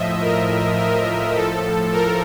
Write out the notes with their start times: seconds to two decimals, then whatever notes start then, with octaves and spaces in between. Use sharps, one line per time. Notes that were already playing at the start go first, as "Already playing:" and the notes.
Already playing: A2 F3 D#5 E5
0.21 A#4
0.79 A#4
1.35 A2 F3 A4
1.93 A#4